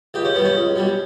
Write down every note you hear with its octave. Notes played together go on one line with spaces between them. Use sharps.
C#2 G4
C#4
B2 G3 B3
C#4
C#2
B2 G3